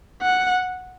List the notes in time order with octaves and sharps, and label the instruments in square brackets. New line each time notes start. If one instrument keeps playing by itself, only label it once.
[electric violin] F#5